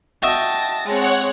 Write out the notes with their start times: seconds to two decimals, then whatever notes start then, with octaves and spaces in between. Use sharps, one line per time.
0.23 F#4 D#5 E5 G5 A5 A#6
0.85 G#3 C4 C#5 F#5